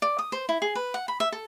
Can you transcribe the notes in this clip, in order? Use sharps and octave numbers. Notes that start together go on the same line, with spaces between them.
D5
D#6
C5
E4
G#4
B4
F#5
B5
E5
A4